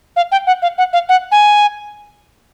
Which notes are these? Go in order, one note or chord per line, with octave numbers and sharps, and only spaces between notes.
F5
G5
F#5
F5
F#5
F5
F#5
G#5